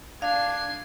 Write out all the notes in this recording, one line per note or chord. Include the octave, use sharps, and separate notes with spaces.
D4 F5 G#6 C7